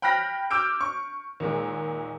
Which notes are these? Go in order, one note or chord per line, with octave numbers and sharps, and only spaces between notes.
G5 B5 F6 F#6 A#6 B6
D6 E6 F6 G6 D7
C#6
D#2 A#2 G#3